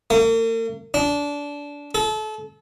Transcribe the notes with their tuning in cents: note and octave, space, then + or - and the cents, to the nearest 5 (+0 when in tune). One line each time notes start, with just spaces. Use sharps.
A#3 -45
D4 -20
A4 -30